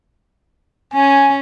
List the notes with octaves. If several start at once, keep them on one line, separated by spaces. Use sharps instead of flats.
C#4 G#5